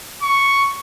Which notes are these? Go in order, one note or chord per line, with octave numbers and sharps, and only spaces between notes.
C#6